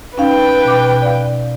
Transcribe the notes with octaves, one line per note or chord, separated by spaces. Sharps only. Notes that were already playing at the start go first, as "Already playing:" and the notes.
C#4 D#4 B4 F5 G5
B2 D6
D5 F5